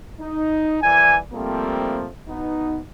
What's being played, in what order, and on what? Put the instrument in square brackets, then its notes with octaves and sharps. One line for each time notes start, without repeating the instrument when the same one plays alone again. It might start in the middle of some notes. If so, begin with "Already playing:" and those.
[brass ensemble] D#4
C2 E3 D5 G#5
F3 G3 A3 A#3 C4
B2 B3 D#4